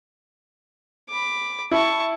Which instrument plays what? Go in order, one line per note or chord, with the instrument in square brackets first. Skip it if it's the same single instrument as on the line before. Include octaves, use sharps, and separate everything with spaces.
[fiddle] B5 D6
[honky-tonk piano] E4 [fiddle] A5 C#6